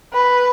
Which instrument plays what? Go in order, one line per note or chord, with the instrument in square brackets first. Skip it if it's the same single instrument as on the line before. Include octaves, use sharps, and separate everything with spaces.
[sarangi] B4